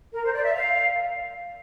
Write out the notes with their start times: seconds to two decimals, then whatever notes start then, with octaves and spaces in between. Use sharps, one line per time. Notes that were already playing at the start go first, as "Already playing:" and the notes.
0.12 A#4
0.23 C5
0.32 D5
0.43 E5
0.53 F5